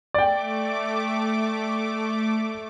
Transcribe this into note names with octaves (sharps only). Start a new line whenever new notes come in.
A3 D5 G5 D6